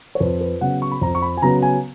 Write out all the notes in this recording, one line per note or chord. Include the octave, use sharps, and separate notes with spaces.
C#5
F2 B4
B4
C#3 F#3 B3 F#5
C#6
B5
F2 A#5
C#6
B5
G#5
C#3 F#3 B3 A#5
G#5